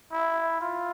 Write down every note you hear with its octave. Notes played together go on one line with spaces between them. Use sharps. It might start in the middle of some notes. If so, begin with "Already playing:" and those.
E4
F4